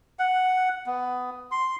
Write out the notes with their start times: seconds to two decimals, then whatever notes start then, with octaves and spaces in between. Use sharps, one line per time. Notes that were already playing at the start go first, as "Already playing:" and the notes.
0.19 F#5
0.86 B3
1.51 C6